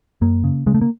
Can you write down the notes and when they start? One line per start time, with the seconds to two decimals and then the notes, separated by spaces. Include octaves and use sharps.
0.21 F#2 A#3
0.44 C#3
0.66 C#3 G#3
0.74 A3
0.81 A#3